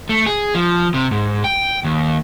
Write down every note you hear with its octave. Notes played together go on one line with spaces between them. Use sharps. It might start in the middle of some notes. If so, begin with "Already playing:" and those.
A3
G#4
F3
C3
G#2
G5
D#2